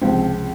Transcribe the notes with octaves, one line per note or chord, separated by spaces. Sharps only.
C#2 C3 F3 C4